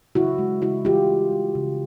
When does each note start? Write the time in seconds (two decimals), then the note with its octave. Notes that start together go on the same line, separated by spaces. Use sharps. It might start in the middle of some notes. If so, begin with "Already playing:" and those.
0.15 C#3 E4 F#4
0.38 G#3
0.62 C#3 E4 F#4
0.85 E3 F4 G4
1.08 C#3
1.31 G#3
1.55 C#3